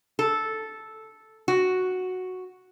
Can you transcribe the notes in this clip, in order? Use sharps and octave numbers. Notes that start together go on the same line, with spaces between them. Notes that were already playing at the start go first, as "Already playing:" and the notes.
A4
F#4